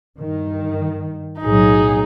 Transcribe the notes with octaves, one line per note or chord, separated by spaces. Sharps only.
G2 D#3
B1 A2 F#3 D#4 G#4